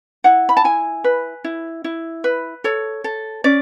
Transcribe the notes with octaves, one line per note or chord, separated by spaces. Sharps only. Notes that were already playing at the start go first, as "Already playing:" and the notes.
E4 F#5
B5
A5
E4 G#5
B4
E4
E4
B4
A4 C#5
A4
C#4 D5